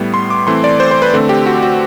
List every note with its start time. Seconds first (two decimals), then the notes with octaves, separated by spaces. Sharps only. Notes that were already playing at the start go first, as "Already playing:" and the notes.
Already playing: A2 G3 B3
0.14 C6
0.30 D6
0.47 E3 A3 C4 C6
0.64 D5
0.80 C5
0.91 C5
1.02 B4
1.13 D3 A3 C4
1.29 G4
1.46 F#4
1.63 F#4